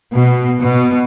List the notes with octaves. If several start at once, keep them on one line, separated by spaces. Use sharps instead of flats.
B2
B2